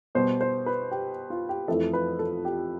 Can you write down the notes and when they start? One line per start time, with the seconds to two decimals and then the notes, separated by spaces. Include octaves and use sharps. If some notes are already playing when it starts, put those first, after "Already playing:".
0.15 B2 G3 B3 C5
0.41 C5
0.66 B4
0.91 G4
1.30 F4
1.49 G4
1.68 F2 E3 A3 A4
1.93 B4
2.19 A4
2.45 G4